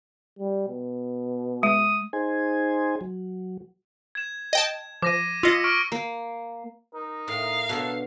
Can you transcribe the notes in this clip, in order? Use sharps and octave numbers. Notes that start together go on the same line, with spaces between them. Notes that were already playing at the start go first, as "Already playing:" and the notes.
G3
B2
G#3 D#6
D#4 G#4 C5 G#5
F#3
G#6 E7
D#5 G5 A5
F3 D6 A#6 D#7
F4 D#5 E6 B6 C#7
C#6 F6 D7
A#3
D#4 A#4
A2 F5
B2 D3 A4 C#5